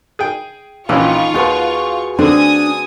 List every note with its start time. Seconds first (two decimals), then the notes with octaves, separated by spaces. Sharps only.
0.19 G#4 G5
0.89 A#1 D#3 E3 C#4 F4 C#6
1.34 D#2 F#4 G#4 B4
2.19 D3 A3 C4 D4 G#5 D#6